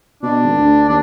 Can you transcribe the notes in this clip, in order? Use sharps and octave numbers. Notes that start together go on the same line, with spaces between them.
B2 D4
G#1
D2
D#2 D4